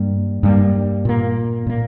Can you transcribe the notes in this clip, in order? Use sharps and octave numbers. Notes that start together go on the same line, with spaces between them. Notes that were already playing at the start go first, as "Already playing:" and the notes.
Already playing: G2 G3 A#3
G2 G3 A#3
A#2 A#3
A#2 A#3